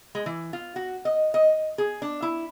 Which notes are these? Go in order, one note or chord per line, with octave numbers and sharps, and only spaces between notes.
G#3
E3
F4
F#4
D#5
D#5
G#4
D4
E4